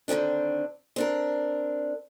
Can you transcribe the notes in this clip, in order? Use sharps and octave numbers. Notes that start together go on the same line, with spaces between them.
D3 D#3 G#3 C4 D4
C4 D4 A#4